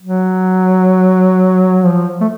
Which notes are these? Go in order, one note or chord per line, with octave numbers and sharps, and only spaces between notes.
F#3
F3
A3